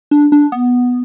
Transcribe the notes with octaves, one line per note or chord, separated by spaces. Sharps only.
D4
D4
B3